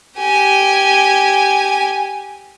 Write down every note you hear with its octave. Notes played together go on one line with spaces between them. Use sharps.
G4 G#5